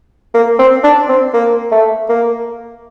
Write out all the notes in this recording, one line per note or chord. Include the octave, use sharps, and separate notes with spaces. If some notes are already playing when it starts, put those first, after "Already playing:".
A#3
C4
D4
C4
A#3
A3
A#3